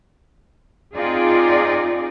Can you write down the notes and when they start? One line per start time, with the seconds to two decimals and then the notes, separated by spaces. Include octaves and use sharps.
0.96 C4 D#4 F4 G#4 D5